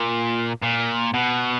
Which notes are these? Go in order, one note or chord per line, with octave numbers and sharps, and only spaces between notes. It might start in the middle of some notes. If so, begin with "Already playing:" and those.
Already playing: A#2
A#2
B2